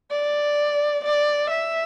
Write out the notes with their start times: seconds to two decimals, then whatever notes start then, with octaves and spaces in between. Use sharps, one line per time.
0.11 D5
1.04 D5
1.50 E5